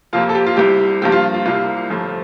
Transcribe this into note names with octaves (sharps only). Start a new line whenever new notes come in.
F2 C3 F3 A#3 F4
A4
G4
F4
C2 C3 G3 G4
G2 F3 A#3 G4
F4
F4
C2 C3 G3 A#3 F4
G1 F2 C3 F3 A3